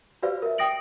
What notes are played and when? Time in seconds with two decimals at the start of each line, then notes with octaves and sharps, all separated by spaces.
0.23 F#4 G4 B4 C5 D5 F5
0.42 A#4 E5
0.58 G5 D#6 A#6 D7 F#7